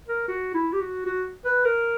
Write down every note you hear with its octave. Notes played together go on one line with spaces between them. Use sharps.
A#4
F#4
E4
G4
F#4
F#4
B4
A#4